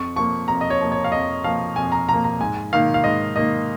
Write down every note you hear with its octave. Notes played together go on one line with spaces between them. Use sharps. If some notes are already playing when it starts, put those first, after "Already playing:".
Already playing: F2 C#6
F3 A#3 C#6
F2 A#5
D#5
C#5
F3 A#3
C#5
F5
F2 D#5
F3 A#3 F5
F2 G#5
A#5
F3 A#3 A#5
A#5
G#2 G#5
D#3 A#3 F5
F5
G#2 D#5
D#3 A#3 D#5